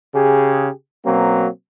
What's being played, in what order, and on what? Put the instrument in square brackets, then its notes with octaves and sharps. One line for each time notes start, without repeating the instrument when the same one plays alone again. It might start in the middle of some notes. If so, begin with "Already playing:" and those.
[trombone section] C#3 G4 G#4
B2 F#3 A#3 C4